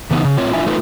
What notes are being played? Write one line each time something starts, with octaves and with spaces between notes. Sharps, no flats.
C#3 E3 B3 D#4
C#3
A2 C4 F4 C#5
D4 E4 F4 E5 G#5
A3 D#4 F4 B4